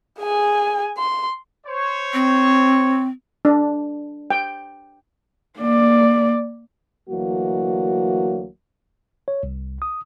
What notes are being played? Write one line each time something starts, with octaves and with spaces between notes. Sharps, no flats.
G#4 G#5
C6
C5 C#5
C4
D4
G5
A#3 D5
D2 E3 F#3 A#3 F#4
C#5
C2
D#6